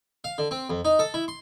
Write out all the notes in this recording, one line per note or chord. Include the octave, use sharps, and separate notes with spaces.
F5
D3
C4
F2
D#4
A4
E4
C6